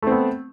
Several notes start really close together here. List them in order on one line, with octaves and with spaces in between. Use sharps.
A3 C4 B3